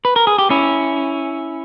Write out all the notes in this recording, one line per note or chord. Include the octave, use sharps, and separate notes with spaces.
B4
A#4
G#4
G4
C#4 E4